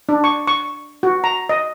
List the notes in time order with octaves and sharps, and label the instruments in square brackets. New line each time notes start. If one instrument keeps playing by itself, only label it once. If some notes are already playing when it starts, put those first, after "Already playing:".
[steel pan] D4
C#6
C#6
F#4
A#5
D#5